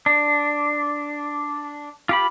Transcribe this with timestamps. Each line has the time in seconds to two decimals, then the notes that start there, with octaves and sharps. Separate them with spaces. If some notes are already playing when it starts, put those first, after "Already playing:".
0.06 D4
2.09 F4 G4 B5